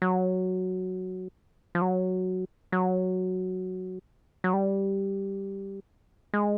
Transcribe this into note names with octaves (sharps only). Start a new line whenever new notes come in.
F#3
F3
F#3
F#3
F#3
G3
G#3